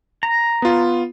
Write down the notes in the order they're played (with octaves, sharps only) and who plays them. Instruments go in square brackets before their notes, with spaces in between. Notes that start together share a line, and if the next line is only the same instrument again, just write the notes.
[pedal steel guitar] A#5
[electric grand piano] B3 F4